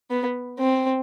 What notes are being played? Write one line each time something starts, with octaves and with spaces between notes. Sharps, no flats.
B3
C4